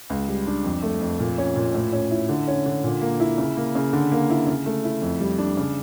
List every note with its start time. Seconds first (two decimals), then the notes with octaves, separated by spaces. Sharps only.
0.10 C#2
0.28 G3
0.47 D4
0.64 F2
0.83 A3
1.01 F2
1.20 A#2
1.38 C#4
1.56 A#2
1.74 A2
1.93 C#4
2.11 E4
2.29 D3
2.48 C#4
2.66 D3
2.84 A#2
3.02 A#3
3.20 E4
3.38 C#3
3.57 A#3
3.75 C#3
3.93 D3
4.12 A#3
4.30 E4
4.47 C#3
4.66 A3
4.84 E4
5.02 F2
5.20 G3
5.39 D4
5.57 C#3